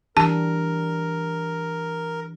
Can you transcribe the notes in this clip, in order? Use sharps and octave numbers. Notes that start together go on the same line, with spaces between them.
E3 D4 G4 A#4 A5